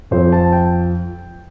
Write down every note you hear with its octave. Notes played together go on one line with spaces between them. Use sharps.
F2 F3 C4 C5
A5
G5